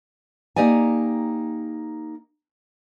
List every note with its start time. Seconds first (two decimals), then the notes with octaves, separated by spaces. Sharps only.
0.56 A#3 D#4 G4 D5 G#5